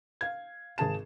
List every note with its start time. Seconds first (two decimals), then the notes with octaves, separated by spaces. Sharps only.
0.21 F5 G#6
0.78 G#1 G#4 A5 E7